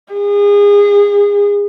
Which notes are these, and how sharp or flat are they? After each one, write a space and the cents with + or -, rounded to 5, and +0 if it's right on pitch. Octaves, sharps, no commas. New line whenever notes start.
G#4 -30